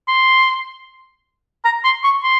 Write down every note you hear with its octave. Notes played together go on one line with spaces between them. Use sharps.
C6
A#5
C6
C#6
C6